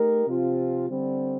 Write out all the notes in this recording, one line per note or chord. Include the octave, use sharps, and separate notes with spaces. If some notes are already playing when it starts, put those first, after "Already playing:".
Already playing: A3 D#4 G4 A#4
C3 F3 C4 F4
D3 G3 C4